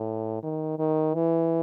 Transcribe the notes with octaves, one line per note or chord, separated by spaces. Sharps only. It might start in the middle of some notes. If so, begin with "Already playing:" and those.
Already playing: A2
D#3
D#3
E3